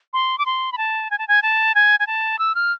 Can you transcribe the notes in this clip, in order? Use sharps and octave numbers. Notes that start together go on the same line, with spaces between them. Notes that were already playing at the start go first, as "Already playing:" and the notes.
C6
D6
C6
B5
A5
G#5
A5
G#5
A5
G#5
G#5
A5
E6
F6